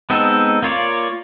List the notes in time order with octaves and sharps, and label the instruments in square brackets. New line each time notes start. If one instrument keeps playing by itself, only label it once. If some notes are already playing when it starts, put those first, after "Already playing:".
[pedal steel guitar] G#3 B3 C4 D#4 A4
A#3 F4 C#5 D5